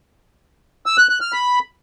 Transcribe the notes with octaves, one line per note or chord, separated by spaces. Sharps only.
E6
F#6
F#6
F6
B5